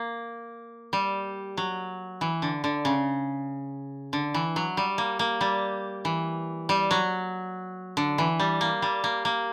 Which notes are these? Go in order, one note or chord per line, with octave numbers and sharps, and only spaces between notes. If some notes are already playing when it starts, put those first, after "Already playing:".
Already playing: A#3
G3
F#3
E3
D3
D3
C#3
D3
E3
F#3
G3
A#3
A#3
G3
E3
G3
F#3
D3
E3
G3
A#3
G3
A#3
A#3